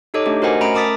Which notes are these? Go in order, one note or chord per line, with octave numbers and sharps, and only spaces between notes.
D#4 G4 A4 C#5 D#5 D6
A3 D4 G4
F#4 A#4 C5 D#5 F#5 G#5
A3 C#4 A#5 B5 D7
A#4 A5 D6 D#6 A6 B6